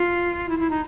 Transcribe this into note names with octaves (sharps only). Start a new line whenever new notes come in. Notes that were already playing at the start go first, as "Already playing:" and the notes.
Already playing: F4
E4
E4
D#4